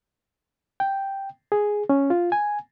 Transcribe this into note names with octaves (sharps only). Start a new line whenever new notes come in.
G5
G#4
C#4
F4
G#5